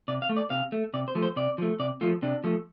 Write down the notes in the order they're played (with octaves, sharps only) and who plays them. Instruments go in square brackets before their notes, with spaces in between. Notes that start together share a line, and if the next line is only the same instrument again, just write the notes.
[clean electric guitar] C3 D5
F5
A3
D5
C3 F5
A3
C3 D5
C5
F3 A3
C5
C3 D5
F3 A3
C3 D5
F3 A3 F4
C3 D4
F3 A3